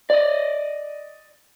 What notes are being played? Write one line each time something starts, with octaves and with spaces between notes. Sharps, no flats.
D5 D#5